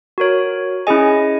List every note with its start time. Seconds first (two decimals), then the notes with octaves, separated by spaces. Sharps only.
0.18 F#4 A#4 C#5
0.87 C#4 E4 G#4 D#5 G#5